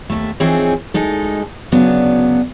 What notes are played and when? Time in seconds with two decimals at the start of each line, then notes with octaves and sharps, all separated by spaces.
0.10 D#2 A3
0.40 E3 F3 C4 D#4 G#4 C#5
0.94 D2 G#3 D#4 A4
1.72 D2 C#3 F#3 B3 D4